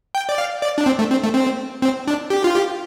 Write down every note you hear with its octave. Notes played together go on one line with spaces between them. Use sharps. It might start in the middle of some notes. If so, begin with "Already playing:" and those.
G5
D5
F5
D5
D4
C4
A3
C4
A3
C4
C4
D4
G4
F4
G4